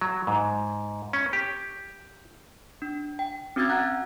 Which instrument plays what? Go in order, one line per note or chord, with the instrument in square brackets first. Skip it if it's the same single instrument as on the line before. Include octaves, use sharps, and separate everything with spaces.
[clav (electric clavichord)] F#3
G#2
C#4
G4
[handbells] D4
G5
C4 C#4 F#4 E6 G#6 A6
F#5 A#5 F#6